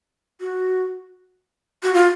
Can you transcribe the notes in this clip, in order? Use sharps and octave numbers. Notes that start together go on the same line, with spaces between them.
F#4
F#4
F4